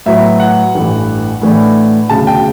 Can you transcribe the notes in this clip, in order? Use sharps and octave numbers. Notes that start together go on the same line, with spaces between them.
A2 F#3 B3 E5
F#5
A1 G2 E3 A3
A2 E3 A3 D4
E1 D2 C#3 A5
G5